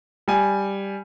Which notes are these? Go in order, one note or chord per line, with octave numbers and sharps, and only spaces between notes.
G3 G#5